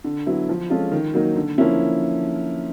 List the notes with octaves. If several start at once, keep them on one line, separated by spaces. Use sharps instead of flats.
D3
F#3 B3 E4
F3
G#3 C#4 F4 A4
D#3
F#3 A#3 D#4
D3
F3 A#3 C#4 E4